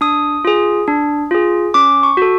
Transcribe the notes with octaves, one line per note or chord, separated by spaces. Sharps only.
D4 D#6
F4 G#4
D4
F4 G#4
C#4 D6
C#6
F#4 A4